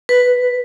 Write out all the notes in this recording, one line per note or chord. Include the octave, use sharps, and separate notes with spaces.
B4